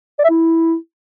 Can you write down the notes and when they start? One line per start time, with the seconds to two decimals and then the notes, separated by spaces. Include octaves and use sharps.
0.19 D5
0.24 E5
0.30 E4